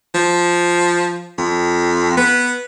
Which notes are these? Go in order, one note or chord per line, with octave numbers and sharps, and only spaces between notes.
F3
F2
B3